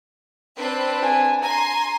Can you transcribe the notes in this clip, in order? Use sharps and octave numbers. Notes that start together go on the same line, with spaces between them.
C4 D4 B4
G#5
G#5 A#5 C6